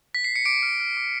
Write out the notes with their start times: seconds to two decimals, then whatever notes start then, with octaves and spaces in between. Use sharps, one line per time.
0.15 B6
0.24 C7
0.36 C#7
0.45 D6 D7
0.63 F6
0.80 F6
0.97 D6